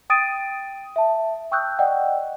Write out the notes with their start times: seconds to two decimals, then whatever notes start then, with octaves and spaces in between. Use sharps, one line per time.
0.10 G5 D#6 A6 D7 D#7
0.96 E5 A5
1.51 G5 C#6 D#6 E6 F#6 G6
1.79 D5 D#5 F#5 G5